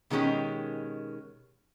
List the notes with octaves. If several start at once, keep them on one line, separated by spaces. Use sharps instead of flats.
B2 D#3 G#3 C#4 G4